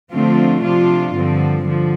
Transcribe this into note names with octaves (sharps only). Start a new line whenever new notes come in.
D3 F3 A3 C4 F4
C3 F3 D4 F4
G2 D3 F3 C4
D3 F3